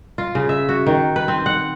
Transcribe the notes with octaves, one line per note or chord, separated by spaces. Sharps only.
F4
C#3
E5
F#4
D#3
B4
C4
F#5